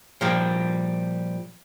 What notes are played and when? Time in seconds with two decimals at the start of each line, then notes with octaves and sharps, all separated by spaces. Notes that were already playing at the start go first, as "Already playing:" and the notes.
0.21 A#2 F3 G3